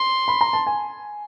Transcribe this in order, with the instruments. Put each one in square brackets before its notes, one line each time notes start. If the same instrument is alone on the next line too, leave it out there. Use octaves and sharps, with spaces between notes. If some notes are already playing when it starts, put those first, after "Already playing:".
Already playing: [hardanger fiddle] C6
[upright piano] B5
A#5
A5
G#5